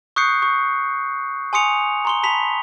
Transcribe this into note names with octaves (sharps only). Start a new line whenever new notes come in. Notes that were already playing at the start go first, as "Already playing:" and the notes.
C#6 D#6 F#6 G6 C7 C#7
C#6
G#5 C6 D#6 C#7 F7
A#5 C6 G7
A5 B5 B6 F7